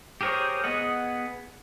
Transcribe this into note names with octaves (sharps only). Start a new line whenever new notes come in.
G4 G#4 A#4 C5 C#5
B3 G#4 D#5 F#5